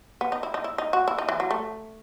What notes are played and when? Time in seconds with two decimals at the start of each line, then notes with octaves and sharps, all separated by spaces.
0.21 B3
0.32 D#4
0.43 E4
0.54 D#4
0.64 E4
0.78 D#4
0.93 F#4
1.08 E4
1.18 D#4
1.29 E3
1.40 F#3
1.51 A3